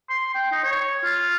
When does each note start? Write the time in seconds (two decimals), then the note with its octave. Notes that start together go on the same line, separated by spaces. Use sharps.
0.10 C6
0.35 G5
0.52 D#4
0.64 C#5
1.04 F4